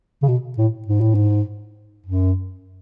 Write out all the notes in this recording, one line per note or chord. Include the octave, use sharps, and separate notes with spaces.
C#3
B2
A2
G#2
A2
G#2
F#2